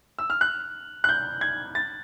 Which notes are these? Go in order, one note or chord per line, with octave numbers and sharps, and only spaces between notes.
E6
F6
F#6
F#6
G6
G#6
A6